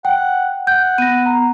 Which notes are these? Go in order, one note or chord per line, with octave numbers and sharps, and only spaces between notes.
F#5 G5
F#5 G6
B3 A#6 D#7
A#5